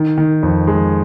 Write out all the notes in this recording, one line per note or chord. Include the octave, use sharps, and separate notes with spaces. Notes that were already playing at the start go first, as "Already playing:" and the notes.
Already playing: D#3
D#3
F2
G#3